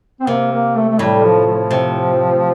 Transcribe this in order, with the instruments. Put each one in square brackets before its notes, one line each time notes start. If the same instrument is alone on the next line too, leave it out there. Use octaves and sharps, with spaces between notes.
[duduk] C4
[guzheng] C3 [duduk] A#3
[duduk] A#3
A3
A3
[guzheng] A2 [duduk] G3
[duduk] F3
F3
[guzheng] C3